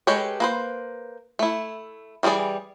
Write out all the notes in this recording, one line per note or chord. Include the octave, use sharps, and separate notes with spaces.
G#3 G4 A4 B4 C#5
A#3 B4 C5
A3 E4
E3 G3 D#4 G#4 D5